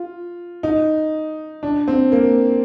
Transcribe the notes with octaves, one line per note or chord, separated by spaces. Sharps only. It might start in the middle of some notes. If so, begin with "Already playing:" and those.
Already playing: F4
D#4
D4
C4
A#3